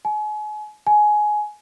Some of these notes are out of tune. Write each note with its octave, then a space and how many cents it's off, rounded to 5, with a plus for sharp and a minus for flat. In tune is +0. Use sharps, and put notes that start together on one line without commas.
G#5 +35
G#5 +15